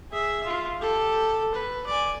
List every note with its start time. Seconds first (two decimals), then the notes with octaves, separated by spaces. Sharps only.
0.11 G#4 E5
0.45 F4
0.79 G4 A4
1.54 B4
1.87 D5 G#5